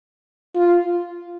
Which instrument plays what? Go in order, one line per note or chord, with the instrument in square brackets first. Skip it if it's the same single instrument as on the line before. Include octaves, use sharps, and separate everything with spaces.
[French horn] F4